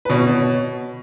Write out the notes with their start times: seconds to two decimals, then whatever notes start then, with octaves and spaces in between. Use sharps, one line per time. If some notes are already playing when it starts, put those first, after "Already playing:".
0.05 B4
0.10 B2 C#5
0.27 B2